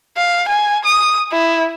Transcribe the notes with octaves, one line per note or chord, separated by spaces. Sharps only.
F5
G#5
D#6
E4